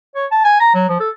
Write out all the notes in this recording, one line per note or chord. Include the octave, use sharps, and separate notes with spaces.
C#5
A5
G#5
A#5
F#3
F3
A4